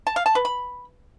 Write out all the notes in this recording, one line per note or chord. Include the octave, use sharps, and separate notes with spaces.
A5
F5
A5
B4
B5